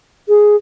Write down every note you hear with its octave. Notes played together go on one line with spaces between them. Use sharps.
G#4